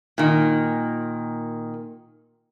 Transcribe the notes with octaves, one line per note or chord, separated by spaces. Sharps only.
A#2 D#3